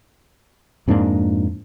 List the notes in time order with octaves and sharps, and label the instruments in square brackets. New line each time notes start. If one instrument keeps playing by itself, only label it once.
[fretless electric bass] F2 G#2 A#3 D4